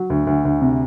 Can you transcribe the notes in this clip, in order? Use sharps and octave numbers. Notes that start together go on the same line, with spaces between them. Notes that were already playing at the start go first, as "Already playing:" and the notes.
Already playing: F#3
D2
D2
D2
C3